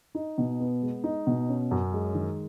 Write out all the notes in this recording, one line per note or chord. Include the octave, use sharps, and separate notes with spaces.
D#4
B2
B3
G#3
D#4
B2
C#4
F#2
G#3
D#3